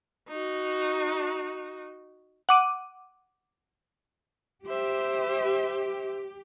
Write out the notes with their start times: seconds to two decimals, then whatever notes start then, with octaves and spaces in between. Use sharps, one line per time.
0.28 D#4 F#4
2.49 F#5 D6 D#7
4.67 G4 C5 E5